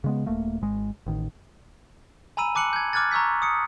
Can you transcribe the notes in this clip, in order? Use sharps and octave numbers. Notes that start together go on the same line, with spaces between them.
C#3 G#3 B3
D#1 A3 A#3
G#1 G#3
A1 D#3
G#5 A#5 B5 E6 D#7
A5 D6 F#6 C#7 F#7
G6 G#6
D6 F6 F#6 G#6 A6
A#5 C#6 E6 G6 B6
D#6 C#7